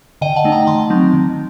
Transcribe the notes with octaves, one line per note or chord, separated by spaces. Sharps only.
D3 D#5 G5
F#5 A5
A3 D#4
G5 A#5
D#3 A5 C6
F#3 C4 D#4
D#3